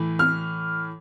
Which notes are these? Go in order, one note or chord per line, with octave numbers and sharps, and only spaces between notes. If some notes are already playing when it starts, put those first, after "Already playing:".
Already playing: A2 E3
F6